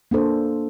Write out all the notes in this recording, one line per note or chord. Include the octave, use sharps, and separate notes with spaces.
A#3 D4 A4 C5